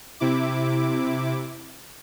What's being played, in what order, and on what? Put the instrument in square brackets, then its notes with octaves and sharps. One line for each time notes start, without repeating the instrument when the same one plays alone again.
[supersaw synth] C3 E4 D6